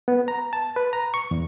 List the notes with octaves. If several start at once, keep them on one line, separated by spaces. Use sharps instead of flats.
B3
A#5
A5
B4
A#5
C#6
E2